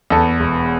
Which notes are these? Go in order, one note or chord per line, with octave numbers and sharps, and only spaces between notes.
E2 A4
E1